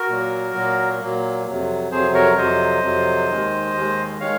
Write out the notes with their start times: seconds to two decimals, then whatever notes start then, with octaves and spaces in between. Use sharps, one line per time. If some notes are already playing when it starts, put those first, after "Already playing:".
Already playing: F#4 A#4
0.09 A#2 F#3 A#3
0.55 A#2 F#3 A#3
1.01 A#2 F#3 A#3
1.47 F2 C3 F#3
1.91 F2 C3 F#3 G#4 C5
2.14 A#4 C#5
2.33 C#5
2.37 F2 C3 F#3 C5 D#5
2.83 F2 C3 F#3
3.29 D#2 D#3 G#3
3.74 D#2 D#3 G#3
4.20 D#3 G#3 C#5 F5